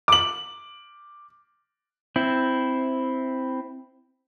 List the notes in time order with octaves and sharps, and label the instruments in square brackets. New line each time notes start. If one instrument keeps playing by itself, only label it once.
[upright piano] D6 F#7
[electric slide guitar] C4 E4